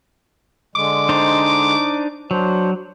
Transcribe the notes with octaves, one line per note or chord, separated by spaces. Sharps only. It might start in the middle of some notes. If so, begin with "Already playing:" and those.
D3 G#3 D6
D4 D#4 C5
F#3 D4 C5